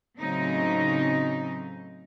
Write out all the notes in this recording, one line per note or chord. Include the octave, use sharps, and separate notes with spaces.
A2 C#3 F#3 A3 C4 D#4